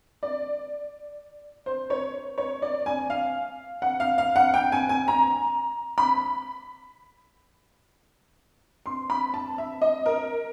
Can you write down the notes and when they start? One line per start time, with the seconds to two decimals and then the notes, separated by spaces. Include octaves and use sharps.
0.23 D5
1.66 C5
1.90 C#5
2.38 C#5
2.62 D5
2.86 G#5
3.10 F5
3.82 F#5
4.00 F5
4.18 F5
4.36 F#5
4.54 G5
4.72 G#5
4.89 G#5
5.08 A#5
5.98 B5
8.86 C6
9.10 B5
9.34 A5
9.58 E5
9.82 D#5
10.06 A#4